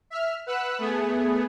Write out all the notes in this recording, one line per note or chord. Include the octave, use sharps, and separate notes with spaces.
E5 F6
B4 F#5 E6 F#6
A3 B3 G#4